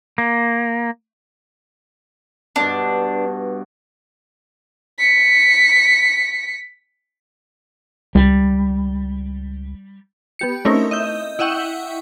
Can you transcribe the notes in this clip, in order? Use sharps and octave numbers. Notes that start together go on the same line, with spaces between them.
A#3
G2 B2 D4
B6 C#7
C#2 G3
B3 G4 C#7
A3 C4 C#4 D#4 E4 A#4
D#5 E5 G6
E4 D#5 E5 F#5 G5 C#6